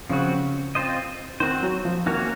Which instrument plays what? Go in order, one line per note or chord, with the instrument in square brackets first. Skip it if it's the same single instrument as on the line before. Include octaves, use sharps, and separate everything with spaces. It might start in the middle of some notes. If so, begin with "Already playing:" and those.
[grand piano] C#3 [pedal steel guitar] F3 C4 F#4
[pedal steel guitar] C4 F4 C5 D#5
[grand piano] D#3 [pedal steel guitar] C4 F#4 C5
[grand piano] F#3
F3
[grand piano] D#3 [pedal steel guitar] A#3 C#4 F#4 A#4 C#5